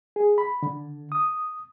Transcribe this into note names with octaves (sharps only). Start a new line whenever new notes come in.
G#4
B5
D3
D#6